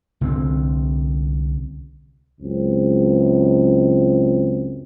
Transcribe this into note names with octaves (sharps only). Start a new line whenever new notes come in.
C2 D3 G#3 C4
C#2 F#2 G#3 C4